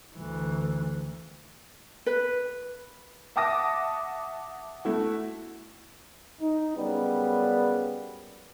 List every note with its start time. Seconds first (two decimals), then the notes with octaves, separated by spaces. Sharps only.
0.16 D2 E3
2.06 B4
3.36 E5 F#5 A5 D6 D#6 A#6
4.85 A3 E4 F#4
6.41 D#4
6.76 F#2 C#3 G3 B3